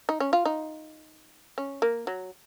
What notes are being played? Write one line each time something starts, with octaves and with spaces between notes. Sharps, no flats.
D#4
C#4
F4
D#4
C#4
A#3
F#3